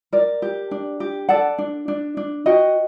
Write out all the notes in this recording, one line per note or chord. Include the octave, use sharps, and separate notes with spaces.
A#4 D5
G4
D4
G4
A4 D5 F#5
D4
D4
D4
F#4 D#5 G5